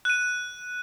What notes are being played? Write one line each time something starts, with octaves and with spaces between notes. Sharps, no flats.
F#6 D#7